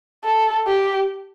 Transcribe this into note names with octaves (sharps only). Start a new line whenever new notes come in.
A4
G4